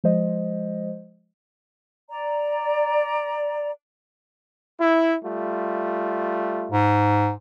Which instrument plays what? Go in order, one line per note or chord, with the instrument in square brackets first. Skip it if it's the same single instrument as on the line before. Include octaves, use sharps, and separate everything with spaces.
[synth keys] F3 G#3 C5 D#5
[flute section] D5 A#5
[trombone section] E4
G3 A3 F4
[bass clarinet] G#2